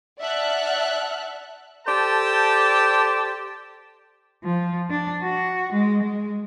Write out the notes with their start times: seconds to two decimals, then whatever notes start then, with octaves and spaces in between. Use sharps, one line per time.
0.21 D5 E5 F#5 A5 F6 F#6
1.87 G4 A4 C5 D5 G5 A5
4.44 F3
4.90 D4
5.23 F#4
5.73 G#3
6.02 G#3